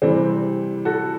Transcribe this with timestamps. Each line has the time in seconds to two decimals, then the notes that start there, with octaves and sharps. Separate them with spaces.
0.02 C3 E3 G3 C4
0.85 F#4 A4